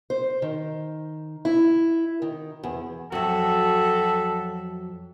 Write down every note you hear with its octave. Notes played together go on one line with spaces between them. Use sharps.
C5
D#3
E4
D#3
E2
F2 F#3 F#4 A4 E5